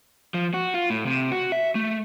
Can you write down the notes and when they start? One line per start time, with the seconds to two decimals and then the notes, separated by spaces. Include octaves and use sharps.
0.34 F3
0.54 F#4
0.74 F4
0.90 A2
1.06 C3
1.32 F#4
1.52 E5
1.75 A3